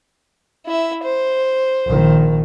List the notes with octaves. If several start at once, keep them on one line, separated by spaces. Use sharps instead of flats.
E4 E5
C5
A#1 D#3